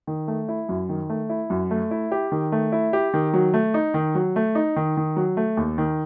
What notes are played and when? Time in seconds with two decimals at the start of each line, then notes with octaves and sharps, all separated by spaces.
0.07 D#3
0.28 A3
0.48 E4
0.69 F#2
0.89 D#3
1.10 A3
1.29 E4
1.50 F#2
1.71 A3
1.91 E4
2.11 G4
2.32 D#3
2.52 A3
2.72 E4
2.93 G4
3.14 D#3
3.33 F#3
3.54 A3
3.74 D#4
3.94 D#3
4.15 F#3
4.36 A3
4.55 D#4
4.76 D#3
4.97 D#3
5.16 F#3
5.37 A3
5.57 D#2
5.78 D#3